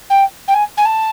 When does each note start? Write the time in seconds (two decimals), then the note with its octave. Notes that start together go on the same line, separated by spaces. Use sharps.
0.10 G5
0.48 G5
0.54 G#5
0.77 G#5
0.85 A5